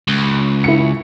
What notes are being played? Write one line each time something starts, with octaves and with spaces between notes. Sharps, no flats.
C#2
E4 C#7